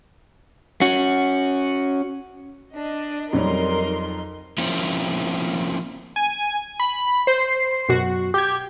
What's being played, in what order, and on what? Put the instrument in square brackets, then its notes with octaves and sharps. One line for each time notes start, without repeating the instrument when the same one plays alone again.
[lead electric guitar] C#4 F#4
[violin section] D4 D#5
[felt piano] F2 F#3 G3 [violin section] D#4 A#4 C6
[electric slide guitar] F3 A#3 C4 C#4 E4
[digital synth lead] G#5
B5
[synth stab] C5 [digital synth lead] C7
[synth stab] F#2 B2 F#4
[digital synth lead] G4 [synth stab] G6 G#6